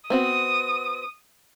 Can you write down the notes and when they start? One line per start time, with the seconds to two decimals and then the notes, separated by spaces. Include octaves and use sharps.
0.10 B3 C4 F#4 D#6